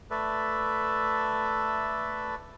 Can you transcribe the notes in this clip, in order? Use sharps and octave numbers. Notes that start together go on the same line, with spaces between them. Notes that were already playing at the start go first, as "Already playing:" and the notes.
A3 A4 B4 D5 E5